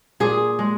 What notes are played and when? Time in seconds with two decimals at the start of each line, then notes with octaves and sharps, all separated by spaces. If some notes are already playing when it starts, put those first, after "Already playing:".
0.20 A#2 G#4
0.59 G#3